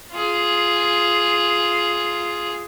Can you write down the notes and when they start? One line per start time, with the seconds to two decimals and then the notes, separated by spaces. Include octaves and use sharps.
0.12 F4 G#4